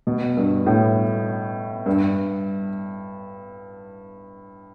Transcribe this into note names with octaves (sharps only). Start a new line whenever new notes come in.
B2
G2
A2
G2